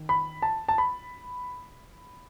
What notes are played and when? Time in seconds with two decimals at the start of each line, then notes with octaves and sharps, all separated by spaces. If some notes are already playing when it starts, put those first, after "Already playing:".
Already playing: D#3
0.09 B5
0.42 A5
0.69 A5
0.78 B5